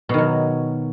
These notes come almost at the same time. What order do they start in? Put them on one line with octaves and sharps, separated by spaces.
B2 D#3 F#3